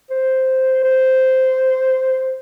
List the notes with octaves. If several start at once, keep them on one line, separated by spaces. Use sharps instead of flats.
C5
C5